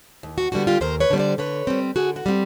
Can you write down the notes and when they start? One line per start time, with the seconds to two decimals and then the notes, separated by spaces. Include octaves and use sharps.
0.23 D#2
0.38 F#4
0.52 D3 G3 B3 F#4
0.67 F4 G4
0.81 D#2 A#4 C5
1.00 B4 C#5
1.10 D3 G3 B3
1.19 C5 D5
1.38 D3 B4 C#5
1.67 G3 C4
1.96 D3 F#4 G#4
2.16 F#4
2.26 G3 C4